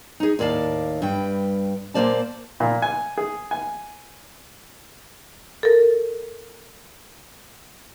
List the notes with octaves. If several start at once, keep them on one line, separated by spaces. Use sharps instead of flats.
D#4 G#4
D#2 A2 D5 F5 A5
G2 B4 G5
A#2 F3 A#3 C5 D5 A5
A#2
G#5
G#4
G#5
A4 A#4